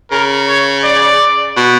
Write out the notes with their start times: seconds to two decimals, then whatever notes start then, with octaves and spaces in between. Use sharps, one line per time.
0.11 C#3 A#4
0.48 C#5
0.84 D5
1.57 B2